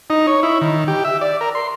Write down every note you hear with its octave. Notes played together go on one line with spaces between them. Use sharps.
D#4
C#5
E4
D#3
G4
E5
D5
A#4
C6